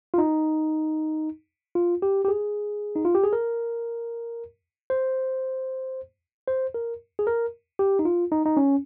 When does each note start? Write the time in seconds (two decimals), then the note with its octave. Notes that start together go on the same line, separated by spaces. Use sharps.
0.14 F4
0.18 D#4
1.75 F4
2.02 G4
2.25 G4
2.28 G#4
2.96 D#4
3.05 F4
3.15 G4
3.24 G#4
3.33 A#4
4.90 C5
6.48 C5
6.74 A#4
7.19 G#4
7.27 A#4
7.79 G4
7.99 D#4
8.05 F4
8.32 D#4
8.46 D#4
8.57 C#4